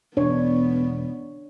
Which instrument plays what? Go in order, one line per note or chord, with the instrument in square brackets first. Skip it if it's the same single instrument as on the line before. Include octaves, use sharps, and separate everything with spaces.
[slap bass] E1 [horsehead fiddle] B3 [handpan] D4 C#5